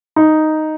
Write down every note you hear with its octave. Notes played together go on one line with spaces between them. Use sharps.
D#4